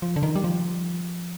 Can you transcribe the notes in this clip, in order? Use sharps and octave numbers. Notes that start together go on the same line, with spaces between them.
F3
D3
D#3
G3
F3